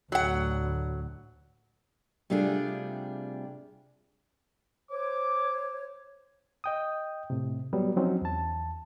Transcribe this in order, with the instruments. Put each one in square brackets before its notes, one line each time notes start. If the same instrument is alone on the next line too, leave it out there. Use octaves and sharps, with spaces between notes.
[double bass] D2 A2 [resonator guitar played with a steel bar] F#3 F#5
[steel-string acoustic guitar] C3 G3 A3 D4 F4 G#4
[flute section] C5 C#5 [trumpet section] D6
[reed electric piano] D#5 G5 D#6
A2 C3
F#3 G3 B3
F3 F#3 C4 C#4 D#4
E2 A5